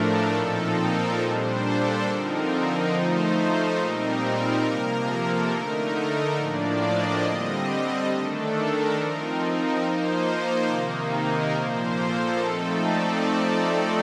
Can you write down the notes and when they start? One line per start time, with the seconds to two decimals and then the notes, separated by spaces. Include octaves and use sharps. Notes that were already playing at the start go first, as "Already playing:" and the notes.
Already playing: A2 F3 A3 D4 A4 A#4
0.33 A#2 F3 C4 D#4 A4
0.77 A#4
1.19 A#2 G3 D4 C5
1.63 A4
2.06 D3 F3 C4 D#4 A#4
2.49 A#4
2.91 F3 A3 D#4 C5
3.35 C5
3.78 A#2 G3 C4 D#4 A#4
4.21 A#4
4.64 C3 F3 A#3
5.07 A4
5.51 D3 A3 D#4 A#4
5.94 A#4
6.36 A2 F3 A#3 D4 D5
6.80 D#5
7.23 D3 G3 C4 D#5
8.08 D#3 A3 D4 A4
8.51 A#4
8.95 F3 C4 D#4 A#4
9.38 A#4
9.80 F3 A#3 D#4 C5
10.67 C3 D#3 A#3 D#4
11.10 A#4
11.53 A#2 F3 A#3 C5
11.96 A4
12.39 F3 A3 C4 D#4
12.82 D5